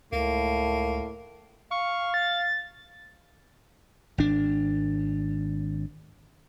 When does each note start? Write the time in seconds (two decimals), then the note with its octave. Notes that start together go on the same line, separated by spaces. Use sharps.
0.12 C#2 A2 A#3
1.71 F5 C#6
2.14 A6
4.18 G#1 D4